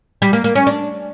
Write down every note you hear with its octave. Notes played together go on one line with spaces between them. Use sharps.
G3
A#3
A#3
C#4
D4